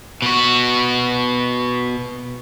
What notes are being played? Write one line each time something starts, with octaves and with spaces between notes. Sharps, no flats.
B2 F#4